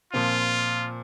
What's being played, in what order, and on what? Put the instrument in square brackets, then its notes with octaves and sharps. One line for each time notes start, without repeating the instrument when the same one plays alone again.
[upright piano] A#2 F3 C4 [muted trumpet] F4